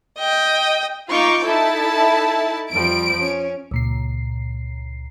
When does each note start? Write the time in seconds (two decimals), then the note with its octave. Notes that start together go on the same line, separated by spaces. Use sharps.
0.18 D#5 G5
1.09 D#4 F4 C#6 D6 G6
1.44 D#4 E4 A4 A5
2.72 F2 F3 G3 D7
3.19 C#4
3.71 C#2 A#2 C7